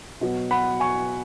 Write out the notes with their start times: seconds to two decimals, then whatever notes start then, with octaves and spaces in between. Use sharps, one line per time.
0.21 B2 F#3
0.51 F#5 B5
0.80 G#5 C#6